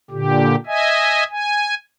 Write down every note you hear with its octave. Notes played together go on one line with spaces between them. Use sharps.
A#2 D3 G4
D#5 E5 G#5
G#5